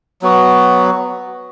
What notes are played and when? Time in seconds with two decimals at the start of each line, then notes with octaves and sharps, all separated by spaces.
0.22 F#3 B3 F#4